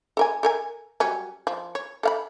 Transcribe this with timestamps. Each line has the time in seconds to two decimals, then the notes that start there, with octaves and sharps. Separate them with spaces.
0.17 A4 A#4 G#5
0.43 A4 A#4 G#5
1.00 F#3 G3 C#4
1.47 F3
1.75 C#5
2.03 A4 F5 B5